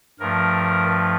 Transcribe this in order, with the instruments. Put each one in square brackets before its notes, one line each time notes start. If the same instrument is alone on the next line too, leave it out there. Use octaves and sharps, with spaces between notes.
[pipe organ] G2 F3 A3 A#4